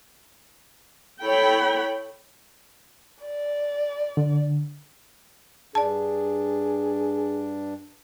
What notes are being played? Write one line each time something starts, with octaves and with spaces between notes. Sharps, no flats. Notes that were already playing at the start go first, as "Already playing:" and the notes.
E4 A4 C#5 G5 B5
D5
D3
G2 D4 G#4 D5 A5